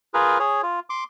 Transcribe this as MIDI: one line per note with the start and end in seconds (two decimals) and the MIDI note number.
0.14 0.39 65
0.14 0.39 68
0.14 0.39 70
0.14 0.39 71
0.39 0.62 68
0.39 0.62 73
0.63 0.80 65
0.90 1.04 84
0.90 1.04 86